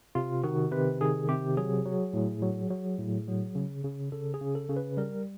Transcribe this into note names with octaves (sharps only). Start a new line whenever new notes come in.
C3 F4
D#3 F#4
C3 B4
D#3 G#4
C3 G4
F#3 G#4
F#3
A2
F#3
F#3
A2
F#3
C#3
C#3
C#3 A4
G#4
C#3
A4
C#3
B4
G3 A#4